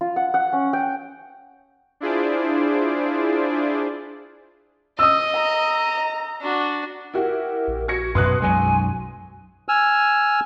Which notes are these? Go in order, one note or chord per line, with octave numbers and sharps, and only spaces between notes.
F4
F#5
F#5
C#4
G5
D4 E4 F4 G#4 C5 D5
D#5 D#6 E6
A#5
D4 F#4
E4 F#4 G4 A#4
A#1
F#4 G#6 A#6 C#7
F#2 B2 B4 C6 D#6 F#6
B1 F#2 F#3 G#3 G#5
G#5 E6 F6